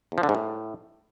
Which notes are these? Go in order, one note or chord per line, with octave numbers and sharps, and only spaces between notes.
E2
F3
D3
G#2
A2